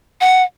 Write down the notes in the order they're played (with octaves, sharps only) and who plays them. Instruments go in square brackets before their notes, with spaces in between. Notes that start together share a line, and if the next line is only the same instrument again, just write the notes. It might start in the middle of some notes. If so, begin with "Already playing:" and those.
[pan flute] F#5